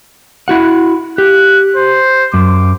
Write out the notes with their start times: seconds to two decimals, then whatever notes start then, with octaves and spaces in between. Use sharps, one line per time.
0.48 E4 F#4 F#5
1.18 G4 F#6
1.76 C5
2.34 F#2 D6